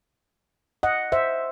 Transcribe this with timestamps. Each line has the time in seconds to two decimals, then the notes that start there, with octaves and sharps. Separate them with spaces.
0.83 D#5 F#5
1.12 C5 E5